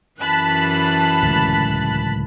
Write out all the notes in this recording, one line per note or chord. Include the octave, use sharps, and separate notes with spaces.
F#2 E3 A5 B5 F#6
D1 C#2